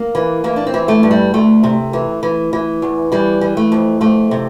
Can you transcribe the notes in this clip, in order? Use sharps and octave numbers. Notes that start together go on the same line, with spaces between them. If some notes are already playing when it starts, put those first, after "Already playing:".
Already playing: A#3
E3
E3 A#3
D4
C4
E3
A3
G2
G3
D2 A3
C3
E3
E3
E3
E2
E3 G3
E3
A3
F2
F2 A3
C3